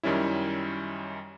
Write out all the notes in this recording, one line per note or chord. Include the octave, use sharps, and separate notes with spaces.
F#2 D#3 G3 C#4 E4